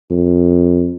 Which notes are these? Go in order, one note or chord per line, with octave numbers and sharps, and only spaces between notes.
F2